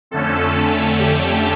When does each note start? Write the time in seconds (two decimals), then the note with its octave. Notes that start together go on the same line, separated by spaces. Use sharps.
0.11 F2 D3 A3 C#4 A4
0.99 G4